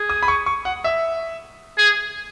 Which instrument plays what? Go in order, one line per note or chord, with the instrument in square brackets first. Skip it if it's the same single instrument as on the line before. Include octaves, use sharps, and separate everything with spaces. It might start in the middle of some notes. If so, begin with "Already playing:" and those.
Already playing: [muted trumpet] G#4
[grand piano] D#6
B5
C#6
C#6
F#5
E5
[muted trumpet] G#4